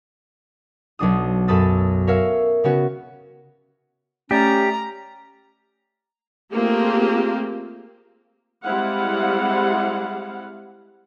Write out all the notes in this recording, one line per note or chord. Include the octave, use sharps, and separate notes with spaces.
B1 F#3 D4 D#6
F#2 A4 B5 D#6 A6
A#4 C#5 E5 F5
C#3 B3 C#4 F#4
A3 C#4 G4 D5 A#5 A6
A3 A#3 C4 F4 G4 G#4
G3 G#3 C4 E4 F5 F#5